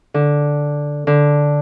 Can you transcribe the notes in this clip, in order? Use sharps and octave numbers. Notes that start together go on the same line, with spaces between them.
D3
D3